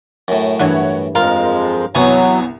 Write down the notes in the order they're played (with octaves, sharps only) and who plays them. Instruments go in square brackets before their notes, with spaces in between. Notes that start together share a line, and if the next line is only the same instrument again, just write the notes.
[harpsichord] F#2 A2
[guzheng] G2 E3 [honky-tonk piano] C#5 F#5
[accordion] F2 F3 G#3 [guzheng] F4 [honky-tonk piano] A#4 [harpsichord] F5
[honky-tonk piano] C2 E3 [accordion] F#3 [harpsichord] B3 C#5 G#5